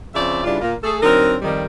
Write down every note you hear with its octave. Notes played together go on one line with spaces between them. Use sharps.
C#3 F3 C4 D5 E5
G2 C#3 G3 D4 E4 F4
A#2 A#3 F4
A3 G#4 A4
D3 F#3 C4 D#4 A#4
F2 D#3 G3